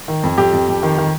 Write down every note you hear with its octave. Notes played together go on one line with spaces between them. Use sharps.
D#3
F2
F2 G4
F2
F2
D#3
D#3